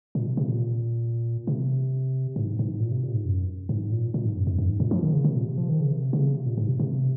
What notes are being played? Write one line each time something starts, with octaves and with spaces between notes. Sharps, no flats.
A#2
C3
C3
A#2
C3
G#2
G#2
A#2
C3
A#2
G#2
F#2
G#2
A#2
A#2
G#2
F#2
F2
F#2
G#2
A#2
F3
D#3
C#3
C3
A#2
C3
F3
D#3
C#3
C3
C#3
C3
A#2
G#2
C3
C3